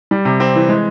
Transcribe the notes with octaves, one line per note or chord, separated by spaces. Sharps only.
G3
C3
C4
E3
G#3